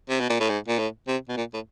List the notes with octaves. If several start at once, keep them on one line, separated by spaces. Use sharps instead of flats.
C3
B2
A#2
A2
G#2
A#2
A2
C3
B2
A#2
A2